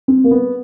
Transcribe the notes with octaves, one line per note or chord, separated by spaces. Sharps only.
C4
A#3
B3